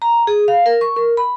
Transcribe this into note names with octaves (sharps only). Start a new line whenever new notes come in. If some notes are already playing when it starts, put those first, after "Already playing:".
A#5
G#4
F5
A#4
C#6
A#4
B5